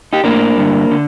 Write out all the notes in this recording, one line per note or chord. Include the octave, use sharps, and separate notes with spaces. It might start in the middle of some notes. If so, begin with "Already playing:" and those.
D#4 G4
A2 A#3 D4
G2 D3
D3